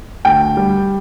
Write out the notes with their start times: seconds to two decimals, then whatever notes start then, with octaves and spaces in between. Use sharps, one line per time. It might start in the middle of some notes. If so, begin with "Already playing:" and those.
0.25 D2 G5
0.57 G3